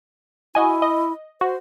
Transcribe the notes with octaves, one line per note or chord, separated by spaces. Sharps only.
E4 F#4 D#5 G#5
D#5
F#4 C5